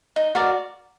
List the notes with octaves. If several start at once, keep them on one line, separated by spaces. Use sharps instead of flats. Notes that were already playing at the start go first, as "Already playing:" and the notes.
D#4
F#4 A#4 D5